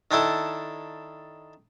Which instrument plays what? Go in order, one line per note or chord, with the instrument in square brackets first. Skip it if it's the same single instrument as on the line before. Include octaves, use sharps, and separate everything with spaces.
[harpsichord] D#3 D4 E4 A4